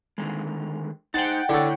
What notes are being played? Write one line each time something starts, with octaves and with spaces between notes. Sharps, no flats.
D3 D#3 G#3
D#4 C5 F#5 G5 A5
D3 E4 A4 C#5